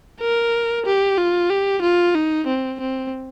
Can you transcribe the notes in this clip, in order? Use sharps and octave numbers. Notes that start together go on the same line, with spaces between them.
A#4
G4
F4
G4
F4
D#4
C4
C4